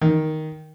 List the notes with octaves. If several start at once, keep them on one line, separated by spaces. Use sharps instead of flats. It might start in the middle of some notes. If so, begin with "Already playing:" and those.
D#3